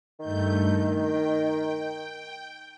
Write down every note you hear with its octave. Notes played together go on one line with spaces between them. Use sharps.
G2 D#3 A3 G6
G5